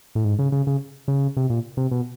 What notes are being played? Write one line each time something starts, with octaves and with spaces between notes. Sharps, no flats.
A2
G#2
C#3
C#3
C#3
C#3
C3
A#2
C3
B2